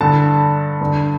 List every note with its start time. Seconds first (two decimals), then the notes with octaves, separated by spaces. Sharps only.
0.01 G2 D3 A5
0.81 G2 D3